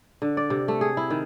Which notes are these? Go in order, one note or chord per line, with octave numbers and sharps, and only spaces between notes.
D3
D5
C3
A3
G#4
E4
D#3